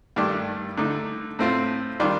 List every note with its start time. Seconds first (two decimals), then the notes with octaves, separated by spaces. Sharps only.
0.16 G2 D#3 A3 D4 G4
0.77 D3 A3 D#4
1.39 A2 A3 C4 F4
2.00 D#3 G3 D4 F4